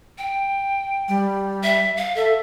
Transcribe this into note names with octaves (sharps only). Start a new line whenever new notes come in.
G5
G3
E5
F5
A4 E5